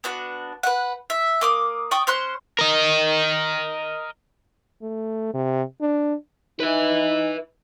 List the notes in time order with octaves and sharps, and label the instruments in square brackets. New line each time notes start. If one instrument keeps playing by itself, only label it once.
[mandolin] B3 D4 F#4
B4 F#5
E5
A#3 D6 D#6
D5 G5 C#6 D#6
C#4 C5 C6 F#6
[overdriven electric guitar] A#4 D#5
[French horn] A3
C3
D4
[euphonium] D#4 [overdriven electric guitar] B4 E5